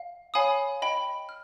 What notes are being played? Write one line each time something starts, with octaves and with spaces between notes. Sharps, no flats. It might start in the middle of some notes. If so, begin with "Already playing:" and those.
Already playing: F5
C#5 F5 G#5 B5 D#6
D#5 G5 B5
F6